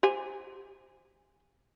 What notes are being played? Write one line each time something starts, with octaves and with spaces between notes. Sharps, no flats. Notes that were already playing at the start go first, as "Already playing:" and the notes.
G4 C5 G#5